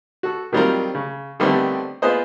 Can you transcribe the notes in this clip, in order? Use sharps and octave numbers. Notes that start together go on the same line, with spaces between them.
F#4 A4
D#3 F#3 G3 C4 F4 A#4
C#3
D3 D#3 G3 A3 B3 C4
B3 F4 G#4 B4 C5 D#5